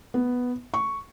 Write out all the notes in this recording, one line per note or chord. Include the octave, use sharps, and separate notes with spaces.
B3
C#6